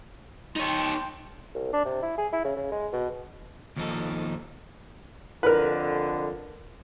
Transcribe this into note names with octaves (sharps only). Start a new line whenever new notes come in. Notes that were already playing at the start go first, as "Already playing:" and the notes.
D#4 C#5 G5 C6
C2
D4
C3
E4
G#4
E4
C#3
C#3
G#3
B2
D#2 F3 D#4 A4
F2 D3 A#4 B4